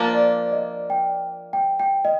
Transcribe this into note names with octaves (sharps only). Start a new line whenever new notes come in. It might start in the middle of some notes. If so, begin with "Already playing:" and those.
Already playing: F3 A#3 D4 C5
D5
D#5
G5
G5
G5
D#5